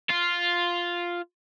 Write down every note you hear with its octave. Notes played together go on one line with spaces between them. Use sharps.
F4